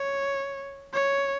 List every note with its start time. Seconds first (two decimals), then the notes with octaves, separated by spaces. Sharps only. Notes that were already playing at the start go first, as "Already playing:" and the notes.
Already playing: C#5
0.94 C#5